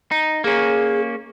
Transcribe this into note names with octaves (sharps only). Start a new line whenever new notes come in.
D#4
A#3 C#4 G#4